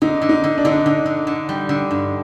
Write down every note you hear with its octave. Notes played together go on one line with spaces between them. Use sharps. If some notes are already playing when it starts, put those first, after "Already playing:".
D3 D#4
D3
D#4
D3
D4
D3 D#4
D4
D3
D3
D3
G3
D3
G2